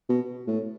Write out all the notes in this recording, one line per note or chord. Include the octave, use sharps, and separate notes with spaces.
B2
A2